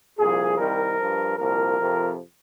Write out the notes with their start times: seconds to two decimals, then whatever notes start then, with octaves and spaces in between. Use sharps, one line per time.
0.18 C2 A#2 F3 G#4
0.58 C2 C3 D#3 G3 A#4
0.99 G2 F3
1.38 C2 A#2 F3 A#4
1.78 F2 C3 F3